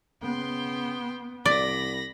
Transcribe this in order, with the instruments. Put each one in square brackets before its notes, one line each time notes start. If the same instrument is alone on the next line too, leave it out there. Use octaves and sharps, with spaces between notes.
[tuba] C#3 [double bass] B3 [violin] G5 C6
[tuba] C2 [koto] D5 [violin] B5 A#6